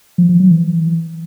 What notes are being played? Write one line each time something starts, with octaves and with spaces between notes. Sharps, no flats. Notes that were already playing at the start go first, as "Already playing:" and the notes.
F3
F3
F#3
E3